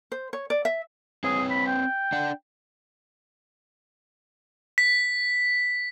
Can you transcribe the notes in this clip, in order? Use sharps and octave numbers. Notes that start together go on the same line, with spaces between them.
C5
C#5
D5
E5
C4 G#4 B4 C#5
B5
G5
D4 F#5
B6